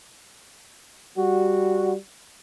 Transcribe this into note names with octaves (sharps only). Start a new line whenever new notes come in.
G3 F#4